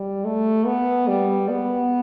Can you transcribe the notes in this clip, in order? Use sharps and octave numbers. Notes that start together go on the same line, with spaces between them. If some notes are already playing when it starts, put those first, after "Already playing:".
Already playing: G3
A3
B3
G3
B3